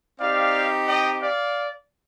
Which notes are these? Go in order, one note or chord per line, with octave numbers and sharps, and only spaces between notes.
C4 D#4 G4 D5 F5
D#5 G5
D5 F5